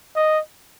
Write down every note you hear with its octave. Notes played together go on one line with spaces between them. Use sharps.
D#5